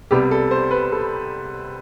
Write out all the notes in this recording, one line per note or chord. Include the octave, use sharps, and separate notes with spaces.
C2 C3 G3 B3 G4
A4
C5
B4
A4